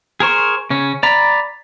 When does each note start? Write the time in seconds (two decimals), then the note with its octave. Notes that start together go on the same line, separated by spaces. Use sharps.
0.20 G#4 A#4 C5 C#6
0.70 C#3 C#4
1.03 D5 A#5 B5